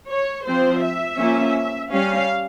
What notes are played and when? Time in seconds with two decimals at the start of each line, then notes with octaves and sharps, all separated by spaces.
0.09 C#5
0.46 F3 C4 C5
0.82 E5
1.19 F3 A#3 C#4
1.91 G3 C#4 F5